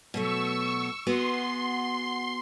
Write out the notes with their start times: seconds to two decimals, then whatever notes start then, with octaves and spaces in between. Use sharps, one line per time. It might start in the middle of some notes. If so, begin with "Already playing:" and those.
0.14 B2 F#3 A3 C#6 E6
1.07 B3 F#4 G#4 C6